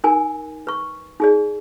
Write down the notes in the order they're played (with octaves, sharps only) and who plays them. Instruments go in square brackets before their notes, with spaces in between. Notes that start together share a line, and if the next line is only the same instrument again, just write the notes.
[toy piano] D#4 A#4 G#5
B4 C#6
D#4 G#4 D5